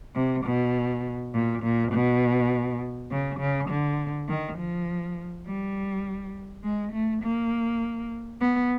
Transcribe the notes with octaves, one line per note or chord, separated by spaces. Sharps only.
C3
B2
A#2
A#2
B2
C#3
C#3
D3
D#3
F3
G3
G#3
A3
A#3
B3